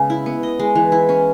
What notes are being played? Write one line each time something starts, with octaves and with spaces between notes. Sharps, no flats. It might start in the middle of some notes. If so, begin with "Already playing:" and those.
Already playing: C#3 G#3 B3
E4
B3
D#5
G#3
E3
E4
C#4